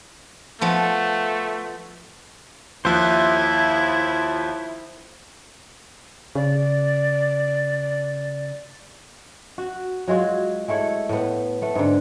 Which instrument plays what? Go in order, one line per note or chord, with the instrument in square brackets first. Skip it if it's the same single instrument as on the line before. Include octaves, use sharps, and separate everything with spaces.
[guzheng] F3 B3 [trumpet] A3
[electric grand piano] D#2 F3 F#6 [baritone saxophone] E4 [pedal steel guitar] C5 E5
[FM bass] C#3 [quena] D5
[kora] F#4
F#3 G#3 F4 F#4
G#3 A3 E4 C#5
A2 B3
A3 B3
G#2 D3